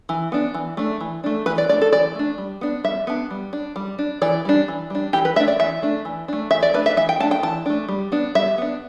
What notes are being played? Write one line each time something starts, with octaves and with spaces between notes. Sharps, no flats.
E3
B3 D4
E3
A3 D4
E3
A3 D4
E3 B4
D5
A3 D4 D5
A4
E3 D5
A3 D4
G3
B3 D4
G3 E5
B3 D4
G3
D4
G3
D4
E3 D5
G3 D4
E3
G3 D4
E3 G4
B4
A3 D4 E5
D5
E3 E5
A3 D4
E3
A3 D4
E3 E5
D5
A3 D4 B4
E5
E3 E5
G5
A3 D4 A5
G5
E3 A5
A3 D4
G3
B3 D4
G3 E5
B3 D4